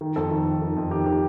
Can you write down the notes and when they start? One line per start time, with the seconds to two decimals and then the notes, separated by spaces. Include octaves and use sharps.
0.01 D#3
0.16 F2 A4
0.31 D#3
0.46 D#3
0.62 D#3
0.76 F2
0.91 D#3 G4
1.06 D#3 G4